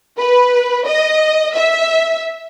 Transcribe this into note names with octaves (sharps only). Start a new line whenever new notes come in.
B4
D#5
E5